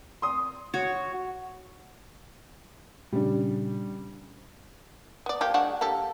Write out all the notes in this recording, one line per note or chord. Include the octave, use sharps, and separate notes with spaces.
C6 D#6
F#4 C#5
A#2 C#3 G3 C#4 D4
B3 D5
F3 A#3 G4
G#3 D4 F#4
A#3 G4 A4